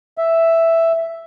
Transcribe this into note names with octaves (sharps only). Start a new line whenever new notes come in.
E5